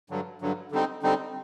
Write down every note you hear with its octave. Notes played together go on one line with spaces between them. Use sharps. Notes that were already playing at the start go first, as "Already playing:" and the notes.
G2 D3 F#3
G2 D3 F#3
D3 G3 C4 D#4
D3 G3 C4 D#4